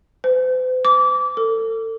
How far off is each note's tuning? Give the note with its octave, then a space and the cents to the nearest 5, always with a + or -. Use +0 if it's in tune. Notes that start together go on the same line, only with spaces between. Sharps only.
C5 -45
D6 -25
A4 +35